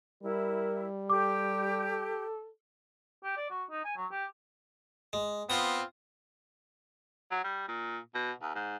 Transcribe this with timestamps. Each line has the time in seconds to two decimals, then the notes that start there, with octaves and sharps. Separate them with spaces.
0.23 G3 E4 A#4
1.10 G4 A4 D6
3.24 G4
3.37 D5
3.50 F#4
3.70 D#4
3.85 G#5
3.97 F#3
4.11 G4
5.13 G#3
5.50 B3 C4 F4 D#6
7.31 F#3
7.44 G3
7.68 A#2
8.15 B2
8.42 D#2
8.55 G#2